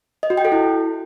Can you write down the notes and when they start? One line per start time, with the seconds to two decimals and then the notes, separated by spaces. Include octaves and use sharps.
0.23 D#5
0.30 F#4
0.37 G5
0.45 A4
0.52 E4